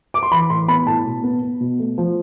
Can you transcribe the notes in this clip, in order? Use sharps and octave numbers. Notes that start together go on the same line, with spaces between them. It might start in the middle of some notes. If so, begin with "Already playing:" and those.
D6
C6
E3 B5
A2 C6
B3 B5
A2 A5
B2
B3
B3
B2
A3
F3